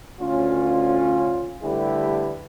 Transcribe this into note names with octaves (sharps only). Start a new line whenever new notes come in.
D2 C#4 F4
D3 G3 A3 E4 G4 B4